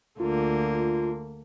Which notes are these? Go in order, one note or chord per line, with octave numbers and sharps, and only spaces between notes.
D2 D3 A#3 F4